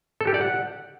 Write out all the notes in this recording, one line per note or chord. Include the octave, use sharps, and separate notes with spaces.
A4
G4
D5
F#5